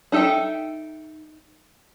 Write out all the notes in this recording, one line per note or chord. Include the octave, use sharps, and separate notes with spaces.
D4 D#4 A4 E5 G5